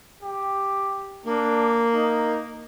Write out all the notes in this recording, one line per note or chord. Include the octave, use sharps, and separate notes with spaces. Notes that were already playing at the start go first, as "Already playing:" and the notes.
G4
A#3 D4
D#4